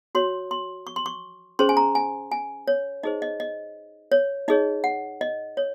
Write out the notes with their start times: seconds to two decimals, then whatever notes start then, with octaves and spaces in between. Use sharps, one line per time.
0.15 F#4 C#5 C6
0.51 C6
0.87 C#6
0.96 C6
1.06 C#6
1.59 C#4 G#4 C5 C6
1.69 G#5
1.77 A#5
1.95 G#5
2.31 G#5
2.68 C#5
3.03 D#4 G#4 C5 D#5
3.22 D#5
3.40 D#5
4.12 C#5
4.48 D#4 G#4 C#5 D#5
4.84 F#5
5.21 D#5
5.57 C#5